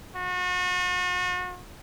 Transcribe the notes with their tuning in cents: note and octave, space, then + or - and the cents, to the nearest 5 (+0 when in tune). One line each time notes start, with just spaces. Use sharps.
F#4 -40